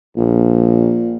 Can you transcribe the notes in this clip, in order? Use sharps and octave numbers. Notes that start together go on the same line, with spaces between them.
A#1 A#2